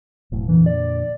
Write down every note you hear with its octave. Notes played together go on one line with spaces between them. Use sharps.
E1 A2 F#3
F2 A#2 D3 E3
D5